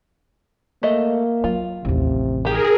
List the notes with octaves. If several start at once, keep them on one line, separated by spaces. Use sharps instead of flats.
A3 A#3 D#5
F#3 F4
A1 D#2 C3
D#3 G4 G#4 A#4